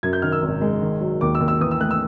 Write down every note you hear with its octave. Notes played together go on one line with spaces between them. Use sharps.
F#2 G#6
G6
D#3 F6
E6
G#1
G#3
D#3
F#3
D#2 D6
E6
D#2
E6
E3 D#6
E6
A3 F#6
E6